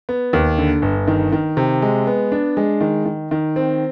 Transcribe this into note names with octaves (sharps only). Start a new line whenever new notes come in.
B3
D#2
D3
G1
D#3
D#3
C3
G#3
B3
D4
G#3
D#3
D#3
D#3
C4